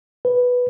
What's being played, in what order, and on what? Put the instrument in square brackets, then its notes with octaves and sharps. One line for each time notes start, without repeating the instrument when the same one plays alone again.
[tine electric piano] B4